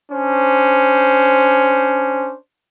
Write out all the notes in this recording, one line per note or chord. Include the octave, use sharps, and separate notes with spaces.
C#4 D4 C5